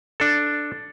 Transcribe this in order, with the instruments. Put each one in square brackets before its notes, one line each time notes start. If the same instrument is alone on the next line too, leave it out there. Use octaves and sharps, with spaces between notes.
[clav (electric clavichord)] D4 A4